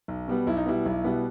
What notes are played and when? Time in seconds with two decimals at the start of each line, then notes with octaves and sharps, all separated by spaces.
0.08 B1
0.28 B2 G3 B3
0.47 B1 E4
0.57 D#4
0.66 B2 G3 B3 E4
0.85 B1
1.04 B2 G3 B3